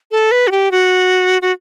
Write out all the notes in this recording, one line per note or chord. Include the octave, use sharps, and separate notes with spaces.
A4
B4
F#4
G4
F#4
F#4